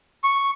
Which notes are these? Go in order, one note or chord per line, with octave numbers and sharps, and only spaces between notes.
C#6